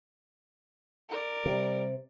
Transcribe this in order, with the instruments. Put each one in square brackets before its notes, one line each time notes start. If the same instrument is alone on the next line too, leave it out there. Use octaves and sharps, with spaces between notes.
[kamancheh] A#4 D5
[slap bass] C3 [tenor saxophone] G3